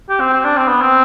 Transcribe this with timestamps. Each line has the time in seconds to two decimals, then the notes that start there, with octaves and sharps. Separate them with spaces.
0.09 G4
0.20 C4
0.33 C4
0.44 D4
0.56 C4
0.68 B3
0.81 C4